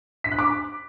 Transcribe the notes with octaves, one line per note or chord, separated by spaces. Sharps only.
B6
F#6
D6